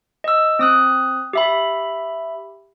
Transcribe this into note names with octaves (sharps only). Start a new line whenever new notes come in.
D#5 E6
C4 D#6 F#6
G4 E5 B5